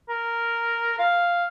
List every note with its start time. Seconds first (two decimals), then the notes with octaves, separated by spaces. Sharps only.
0.09 A#4
0.99 F5